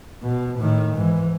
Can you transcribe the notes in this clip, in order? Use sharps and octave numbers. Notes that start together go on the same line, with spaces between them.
B2
A2 D#3
G#2 E3